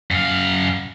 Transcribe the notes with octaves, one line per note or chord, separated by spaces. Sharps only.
F#2 F5